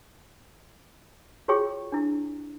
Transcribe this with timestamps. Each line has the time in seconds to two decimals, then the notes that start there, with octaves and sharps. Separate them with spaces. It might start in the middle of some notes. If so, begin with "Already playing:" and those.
1.48 F4 F#4 G#4 C#5 G5 C#6
1.92 D4 E4